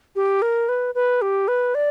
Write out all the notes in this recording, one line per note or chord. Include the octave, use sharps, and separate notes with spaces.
G4
A#4
B4
B4
G4
B4
D5